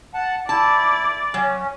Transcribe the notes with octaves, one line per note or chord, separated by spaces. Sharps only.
F#5 A5
E4 D5 A5
F#3 C#4